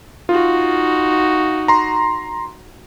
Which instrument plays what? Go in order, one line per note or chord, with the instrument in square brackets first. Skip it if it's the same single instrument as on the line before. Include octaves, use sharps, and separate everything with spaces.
[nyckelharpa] D#4 F#4 [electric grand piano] F4
[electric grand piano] A#5 C6